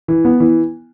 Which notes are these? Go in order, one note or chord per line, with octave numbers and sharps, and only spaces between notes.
E3
B3
E3